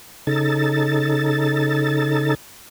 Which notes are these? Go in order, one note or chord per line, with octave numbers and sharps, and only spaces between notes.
C#3 D#4 A4 A6